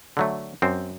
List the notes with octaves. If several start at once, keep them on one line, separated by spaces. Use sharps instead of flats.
D3 F#3 A3
F#2 C4